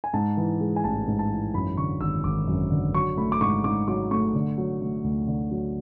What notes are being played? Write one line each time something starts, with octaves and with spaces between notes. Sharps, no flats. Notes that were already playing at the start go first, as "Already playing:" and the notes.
G#5
G#2 A5
E3
G#3
G#5
A1 A5
G#2
A5
E3
F#2 B5
D3 C#6
G#1 E6
G#1 D6
F#2
D3
F#3 C#6
A3 B5
D6
G#2 C#6
G#2 D6
F#3 D6
A3 C#6
D3
F#3
A3
D2
D3
F#3